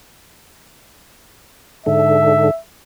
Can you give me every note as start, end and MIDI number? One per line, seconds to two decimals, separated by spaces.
1.86 2.50 44
1.86 2.50 50
1.86 2.59 76